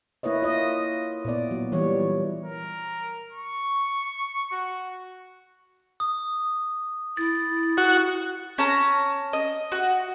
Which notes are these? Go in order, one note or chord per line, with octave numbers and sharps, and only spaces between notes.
A#3 E4 B4 C#5 D#5
F4 D#5
A#2 B3 D5
F#3
E3 G3 C#5
A#4
C#6
F#4
D#6
E4 A6
F#4
C#4 A5 A#5
D#5
F#4